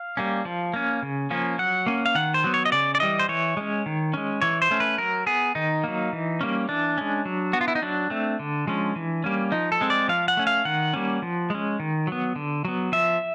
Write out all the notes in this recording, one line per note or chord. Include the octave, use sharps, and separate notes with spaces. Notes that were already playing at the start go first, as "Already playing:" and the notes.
Already playing: F5
G3 A#3 C#4
F3
A#3 C#4
C#3
F3 A#3 C#4
F#3 F#5
A#3 C#4
F5
D#3 F#5
C5
F#3 B3
C#5
D#5
C#3 D5
D5
E3 G3 D#5
C5
E3 C#5
G#3 C#4
D#3
G#3 C#4
E3 C#5
C5
A3 C#4
B4
F#3 A#4
B3 G#4
D#3 D#4
F#3 A#3
E3
G3 A#3 C#4
E3 D4
G#3 C#4
F#3
B3 F#4
F4
E4
D#4
F#3 D4
A3 C4
D3
F3 G#3 C#4
E3
G3 A#3 C#4
F3 D#4
A4
G#3 C4
D5
F3 F5
F#5
A3 C#4
F5
D#3 F#5
G3 A#3 C#4
F3
G#3 C#4
D#3
F#3 B3
D3
F#3 B3
F3 E5